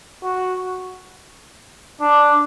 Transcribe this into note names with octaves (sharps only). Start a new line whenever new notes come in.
F#4
D4